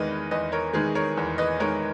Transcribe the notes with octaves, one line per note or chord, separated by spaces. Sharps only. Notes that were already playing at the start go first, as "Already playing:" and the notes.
Already playing: E2 D#3 G#3 B4 D#5
E2 B4 D#5
A#4 C#5
D#3 G#3 G#4 B4
A#4 C#5
E2
B4 D#5
D#3 G#3 A#4 C#5